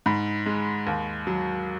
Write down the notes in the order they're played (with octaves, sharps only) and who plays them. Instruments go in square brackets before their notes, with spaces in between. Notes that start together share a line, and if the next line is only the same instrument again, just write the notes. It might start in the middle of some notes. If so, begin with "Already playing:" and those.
[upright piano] G#2 B5
G#3
D#2
F#3